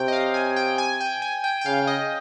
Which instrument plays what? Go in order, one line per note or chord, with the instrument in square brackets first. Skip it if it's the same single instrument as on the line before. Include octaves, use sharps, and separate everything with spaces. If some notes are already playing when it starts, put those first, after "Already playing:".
Already playing: [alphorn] C3 [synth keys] C#5 G5
[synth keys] D#5
F5
G#5
G5
G#5
G5
G#5
G5
G5
[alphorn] C#3 [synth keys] F5
[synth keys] D#5